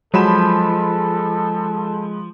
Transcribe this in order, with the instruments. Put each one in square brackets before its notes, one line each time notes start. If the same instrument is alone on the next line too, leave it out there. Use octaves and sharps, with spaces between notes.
[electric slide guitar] F3 [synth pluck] F#3 [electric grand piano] G#3 B5 E7 [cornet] A4